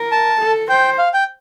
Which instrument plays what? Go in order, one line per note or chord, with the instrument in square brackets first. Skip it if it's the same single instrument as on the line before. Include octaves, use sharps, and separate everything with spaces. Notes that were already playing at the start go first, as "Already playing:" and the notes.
Already playing: [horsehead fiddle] A#4
[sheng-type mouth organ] A5
[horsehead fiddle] A4
[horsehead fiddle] C5 [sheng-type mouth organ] G5
[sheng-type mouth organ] F5
G5